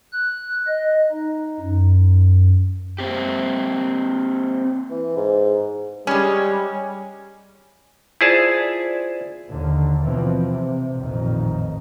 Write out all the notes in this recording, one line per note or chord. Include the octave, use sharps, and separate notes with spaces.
F#6
D#5
D#4
F#2
A#3 C4 G4
E3
G#2
G3 G#3 C#4
E4 F4 G#4 C5 D5 A5
D#2 D3
B2 E3 F3 C4
C3
A1 F2 A#2 D#3